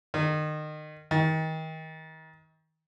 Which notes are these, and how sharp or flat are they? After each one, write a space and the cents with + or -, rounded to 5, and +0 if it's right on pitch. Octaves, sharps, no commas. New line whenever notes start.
D#3 -25
D#3 +35